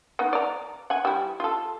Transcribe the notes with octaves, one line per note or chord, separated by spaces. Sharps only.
B3 D#4
D5 A#5
F#5 G#5
G3 E4
F4 A4